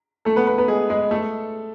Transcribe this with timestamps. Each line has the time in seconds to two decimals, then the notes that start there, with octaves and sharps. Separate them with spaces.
0.25 A3 A4
0.36 B3 B4
0.47 B3 B4
0.58 B3 B4
0.68 G#3 G#4
0.90 G#3 G#4
1.11 A3 A4